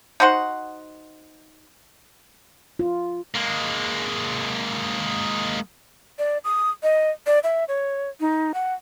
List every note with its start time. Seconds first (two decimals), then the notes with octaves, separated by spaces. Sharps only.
0.20 D#4 F#4 C5 F#5
2.79 F4
3.35 G#3 A#3
6.19 D5
6.44 D#6
6.83 D#5
7.27 D5
7.44 E5
7.68 C#5
8.21 D#4
8.54 F#5